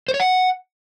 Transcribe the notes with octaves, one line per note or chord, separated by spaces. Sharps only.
C5
C#5
F#5